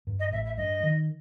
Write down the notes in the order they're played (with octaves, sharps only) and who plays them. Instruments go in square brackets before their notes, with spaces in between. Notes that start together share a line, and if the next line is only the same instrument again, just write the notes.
[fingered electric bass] G2
[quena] D#5
[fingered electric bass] A1 [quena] E5
[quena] E5
[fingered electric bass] G2 [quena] D#5
[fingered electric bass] D#3